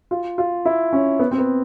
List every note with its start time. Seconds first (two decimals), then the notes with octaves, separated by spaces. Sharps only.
0.11 F4
0.38 F4
0.65 E4
0.93 C#4
1.19 B3
1.31 C4
1.38 B3